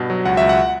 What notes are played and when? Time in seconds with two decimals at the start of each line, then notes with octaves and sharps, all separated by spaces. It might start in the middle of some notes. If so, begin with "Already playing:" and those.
Already playing: G2 B2
0.10 F#3
0.25 C#2 F#5
0.37 C#2 E5
0.49 F#5